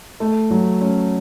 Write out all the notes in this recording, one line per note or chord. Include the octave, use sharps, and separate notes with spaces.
A3
F#3
C#4